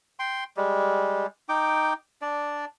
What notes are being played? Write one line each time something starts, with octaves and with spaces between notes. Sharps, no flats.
G5 C6
G3 G#3
D#4 G5 D6
D4 D5